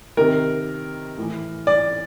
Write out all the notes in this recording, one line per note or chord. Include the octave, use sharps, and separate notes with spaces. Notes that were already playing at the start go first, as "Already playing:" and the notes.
C3 D#3 A#4
A2 E3
D5